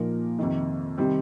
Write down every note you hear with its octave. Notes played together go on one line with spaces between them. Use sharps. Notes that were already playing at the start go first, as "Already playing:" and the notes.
Already playing: A#2 F3 A#3 D#4 A#4
F2 C3 D#3
C3 D#3 G3 C4